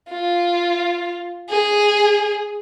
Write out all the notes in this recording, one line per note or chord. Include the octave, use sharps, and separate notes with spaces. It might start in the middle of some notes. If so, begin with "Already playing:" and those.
F4
G#4